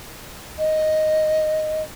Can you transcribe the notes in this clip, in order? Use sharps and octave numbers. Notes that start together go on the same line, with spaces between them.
D#5